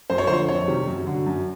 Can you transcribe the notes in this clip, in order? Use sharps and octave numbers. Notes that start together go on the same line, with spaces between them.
F#2 C5
C#5
D3 F3 C5
F2 C#5
C3 D#3 G3
F#2
D3 F#3
F#2